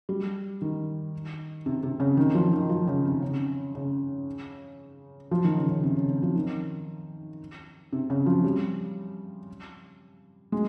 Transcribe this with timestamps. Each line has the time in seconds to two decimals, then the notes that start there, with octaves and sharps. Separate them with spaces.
0.09 G3
0.62 D#3
1.66 C3
1.83 C3
2.00 C#3
2.17 D#3
2.35 F3
2.53 D#3
2.69 F3
2.87 C#3
3.05 C3
3.22 C#3
3.75 C#3
5.31 F3
5.44 D#3
5.57 C#3
5.69 C#3
5.84 C3
5.96 C#3
6.09 C#3
6.22 F3
6.36 D#3
7.92 C3
8.10 C#3
8.26 F3
8.44 G3
10.52 G#3